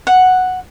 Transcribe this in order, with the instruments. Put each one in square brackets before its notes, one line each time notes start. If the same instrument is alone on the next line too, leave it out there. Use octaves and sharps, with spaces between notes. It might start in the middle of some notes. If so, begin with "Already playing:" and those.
[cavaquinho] F#5